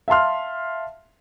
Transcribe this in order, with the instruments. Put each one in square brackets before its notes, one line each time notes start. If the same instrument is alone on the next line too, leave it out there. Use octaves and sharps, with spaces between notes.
[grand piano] E5 F5 A5 C6 F6